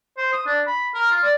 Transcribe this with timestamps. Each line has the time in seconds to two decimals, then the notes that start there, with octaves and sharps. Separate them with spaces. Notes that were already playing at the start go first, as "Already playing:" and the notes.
0.17 C5
0.33 D#6
0.46 D4
0.67 B5
0.94 A#4
1.11 F4
1.23 D5